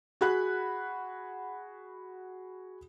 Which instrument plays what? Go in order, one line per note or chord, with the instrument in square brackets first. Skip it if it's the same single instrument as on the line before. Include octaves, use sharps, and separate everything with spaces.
[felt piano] F#4 G#4 F#5 B5 F#6